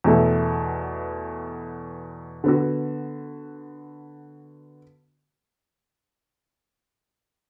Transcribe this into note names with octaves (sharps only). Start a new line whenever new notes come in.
E2 B2 A3
D3 B3 F#4